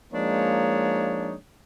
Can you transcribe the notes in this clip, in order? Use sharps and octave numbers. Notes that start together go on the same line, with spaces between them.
F3 G#3 A#3 D4 D#4 C#5